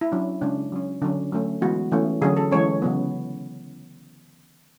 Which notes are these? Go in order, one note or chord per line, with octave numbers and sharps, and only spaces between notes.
E4
F#3 C#4 D4
C#3 G#3 C#4 D4
F#3 C#4
D3 F#3 C#4 D4
F#3 A3 C#4
E3 G#3 B3 F#4
E3 A3 C#4
D3 F#3 C#4 G#4
A4
E3 G#3 C#4 C#5
C#3 F#3 B3